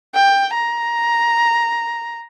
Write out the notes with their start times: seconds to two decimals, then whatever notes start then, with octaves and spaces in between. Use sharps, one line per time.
0.15 G5
0.54 A#5